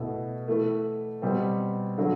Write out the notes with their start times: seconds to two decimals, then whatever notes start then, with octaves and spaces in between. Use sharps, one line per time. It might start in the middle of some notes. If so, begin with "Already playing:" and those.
Already playing: B2 A3 E4
0.48 E3 A3 E4
1.22 B2 G3 C4
1.98 D3 F#3